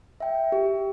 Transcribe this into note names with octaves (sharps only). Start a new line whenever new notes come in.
E5 G5
G4